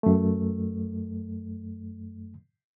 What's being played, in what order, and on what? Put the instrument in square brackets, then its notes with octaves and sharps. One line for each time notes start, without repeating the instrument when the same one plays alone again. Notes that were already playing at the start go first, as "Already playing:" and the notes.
[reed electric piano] F#2 A3